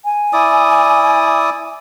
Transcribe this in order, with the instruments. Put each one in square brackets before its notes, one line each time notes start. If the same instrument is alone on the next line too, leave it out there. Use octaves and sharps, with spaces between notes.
[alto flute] G#5
[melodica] E4 D5 D#6